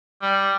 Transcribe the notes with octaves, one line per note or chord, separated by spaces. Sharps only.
G3